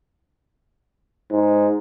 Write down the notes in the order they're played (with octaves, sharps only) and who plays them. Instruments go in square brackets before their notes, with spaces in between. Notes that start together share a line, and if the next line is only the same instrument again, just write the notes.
[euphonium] G#2